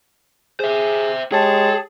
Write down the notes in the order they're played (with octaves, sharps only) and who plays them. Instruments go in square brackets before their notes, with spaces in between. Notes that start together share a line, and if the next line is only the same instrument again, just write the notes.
[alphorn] G#4 [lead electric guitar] C5 E5
[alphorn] G#3 [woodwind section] G4 C#5 A5 [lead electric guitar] G#4